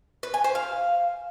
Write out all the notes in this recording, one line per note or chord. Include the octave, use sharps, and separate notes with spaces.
B4
G#5
C5
F5